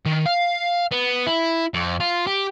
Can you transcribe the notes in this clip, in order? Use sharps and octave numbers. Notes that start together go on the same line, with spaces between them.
D#3
F5
B3
E4
F2
F4
G4